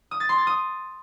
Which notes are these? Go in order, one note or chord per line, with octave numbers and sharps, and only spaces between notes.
D#6
A6
C6
A6
D#6